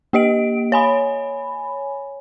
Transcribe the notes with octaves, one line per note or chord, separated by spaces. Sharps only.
A#3 G4 D#5 D7
C#5 G#5 B5